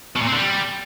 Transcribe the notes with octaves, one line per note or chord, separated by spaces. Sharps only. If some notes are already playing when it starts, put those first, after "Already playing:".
B2
A#2
C4
D3
G3